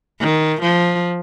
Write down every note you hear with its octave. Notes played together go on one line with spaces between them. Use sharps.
D#3
F3